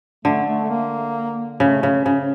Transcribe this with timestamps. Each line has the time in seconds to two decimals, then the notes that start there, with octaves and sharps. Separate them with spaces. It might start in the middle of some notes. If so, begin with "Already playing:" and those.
0.25 D3 A3
0.48 A3
0.64 A3
0.70 A#3
1.60 C#3 A3
1.83 C#3
2.06 C#3